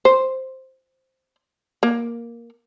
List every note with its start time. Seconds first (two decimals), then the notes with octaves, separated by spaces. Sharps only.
0.05 C5
1.83 A#3